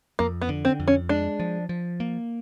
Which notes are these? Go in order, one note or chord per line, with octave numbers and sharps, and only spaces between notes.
F2 A#3
B3
D3
C4
F2
C#4
G#3 D4
F3
F3
A#3